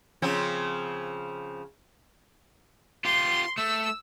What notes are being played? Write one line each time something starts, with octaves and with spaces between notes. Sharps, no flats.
C#3 F3 C4
F4 G4 C6
A3 E6